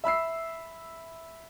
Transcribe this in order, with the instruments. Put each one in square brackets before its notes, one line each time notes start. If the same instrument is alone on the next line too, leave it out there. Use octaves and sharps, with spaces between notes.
[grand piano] E5 B5 E6 C7